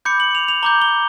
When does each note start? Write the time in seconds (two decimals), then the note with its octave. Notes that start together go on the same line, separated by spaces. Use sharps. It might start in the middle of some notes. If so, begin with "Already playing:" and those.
0.05 B5 D6 G6 C#7
0.20 F#7
0.35 F7
0.48 F7
0.63 A#5 D6 G6 G7
0.82 G7